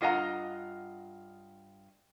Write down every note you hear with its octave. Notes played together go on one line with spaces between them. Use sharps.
G2 F4 D#5 F#5 A#5